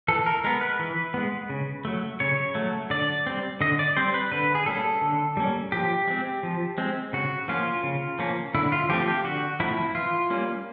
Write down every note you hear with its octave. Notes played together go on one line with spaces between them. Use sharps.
E3 A4
A#4
G#3 B3 A#4
B4
E3
G#3 B3
C#3
F#3 A3
C#3 C#5
F#3 A3
D3 D5
G3 C4
D3 D#5
D5
G3 C4 C5
B4
D3 B4
G#4
G3 A#3 C#4 A4
D3
G3 A#3 C#4
F3 G4
G#3 C4
F3
G#3 C4
C#3 F#4
F3 A#3 C#4 F4
C#3
F3 A#3 C#4
D3 E4
F4
F3 A3 C4 G4
G4
D3 F#4
F3 A3 C4 E4
E3 F4
G3 A#3 C#4